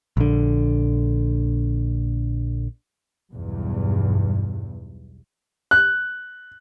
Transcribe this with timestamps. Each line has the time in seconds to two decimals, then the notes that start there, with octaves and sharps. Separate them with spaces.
0.17 A#1 D3
3.32 B1 E2 G2
5.71 F#6